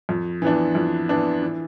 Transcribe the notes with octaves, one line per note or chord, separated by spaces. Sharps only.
F2
E3 B3 D4
F2
E3 B3 D4
E3